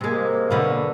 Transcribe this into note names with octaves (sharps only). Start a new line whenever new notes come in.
C3 G#3 A#3
B2 D3